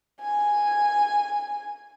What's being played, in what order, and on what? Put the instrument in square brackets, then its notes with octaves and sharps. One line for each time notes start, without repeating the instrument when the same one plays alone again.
[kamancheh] G#5